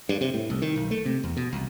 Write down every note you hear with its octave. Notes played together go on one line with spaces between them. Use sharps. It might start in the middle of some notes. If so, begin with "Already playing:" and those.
G2
C3
A2
C2
D#3
B1
A3
C3
E2
B2
C2